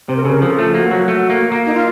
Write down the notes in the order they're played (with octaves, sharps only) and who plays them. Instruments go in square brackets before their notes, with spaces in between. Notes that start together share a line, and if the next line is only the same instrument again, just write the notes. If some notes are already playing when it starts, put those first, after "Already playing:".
[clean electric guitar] C3 [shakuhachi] C5
[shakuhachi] A#4
[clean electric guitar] C#3 [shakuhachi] A4
[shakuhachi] A#4
[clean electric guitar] F3 [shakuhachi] A4
[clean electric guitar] A3
[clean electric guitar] A#3 [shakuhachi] F#4
[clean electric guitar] F#3
[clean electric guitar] A3 [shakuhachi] F#4
[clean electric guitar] A#3
A#3
[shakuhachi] D#4
F4